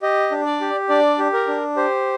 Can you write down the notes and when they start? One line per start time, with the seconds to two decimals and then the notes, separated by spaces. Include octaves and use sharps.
0.02 G4 D#5
0.32 D4
0.46 D5
0.61 G4
0.89 D4 D5
1.19 G4
1.33 A#4
1.48 D4
1.76 G4 C5